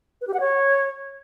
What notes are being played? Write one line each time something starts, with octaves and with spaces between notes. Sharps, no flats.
B4
G4
F#5
C#5